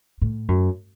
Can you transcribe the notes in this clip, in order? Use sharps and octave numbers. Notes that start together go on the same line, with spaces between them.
A2
F#2